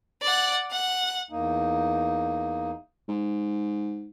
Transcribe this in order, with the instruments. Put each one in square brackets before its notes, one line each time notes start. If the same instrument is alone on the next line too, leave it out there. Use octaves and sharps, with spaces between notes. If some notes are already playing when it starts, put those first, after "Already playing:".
[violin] D5 F#5
F#5
[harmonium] E2 A#3 D#4
[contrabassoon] G#2